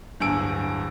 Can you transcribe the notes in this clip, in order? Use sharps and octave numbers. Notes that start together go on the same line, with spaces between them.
D1 G2 G#5 E6 D7